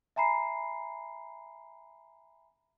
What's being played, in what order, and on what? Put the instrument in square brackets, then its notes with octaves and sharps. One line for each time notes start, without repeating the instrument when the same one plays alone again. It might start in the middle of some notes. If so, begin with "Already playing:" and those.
[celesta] E5 G#5 A#5 B5 C7